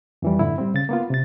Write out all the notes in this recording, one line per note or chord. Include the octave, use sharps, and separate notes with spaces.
F2 E3 G3
F#2 A2 D3 E4
G3 C4
C#3 A6
A#3 B3 F4
C3 A6